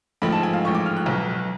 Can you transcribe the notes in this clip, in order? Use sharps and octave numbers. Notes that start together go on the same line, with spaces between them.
A1 G#2 F3 A3 B5
A5
G#5
F5
A1 G#2 F3 A3 C#6
D6
F6
F#6
B1 B2 F#3